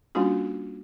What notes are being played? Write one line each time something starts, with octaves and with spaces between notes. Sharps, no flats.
G3 A#3 C#4 D4 F4 F#4